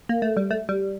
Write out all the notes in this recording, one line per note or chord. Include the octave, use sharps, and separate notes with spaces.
A#3
A3
G3
A3
G3